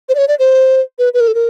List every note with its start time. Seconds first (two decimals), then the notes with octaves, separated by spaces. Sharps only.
0.09 C5
0.15 D5
0.18 C#5
0.28 D5
0.39 C5
0.99 B4
1.14 B4
1.20 A#4
1.28 A4
1.35 A#4